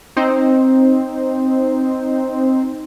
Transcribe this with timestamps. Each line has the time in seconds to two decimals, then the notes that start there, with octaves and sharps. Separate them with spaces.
0.17 C4 D#4 C5